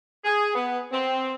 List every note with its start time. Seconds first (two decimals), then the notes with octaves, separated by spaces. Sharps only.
0.24 G#4
0.55 B3
0.92 C4